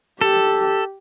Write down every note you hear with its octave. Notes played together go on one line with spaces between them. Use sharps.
G4 A4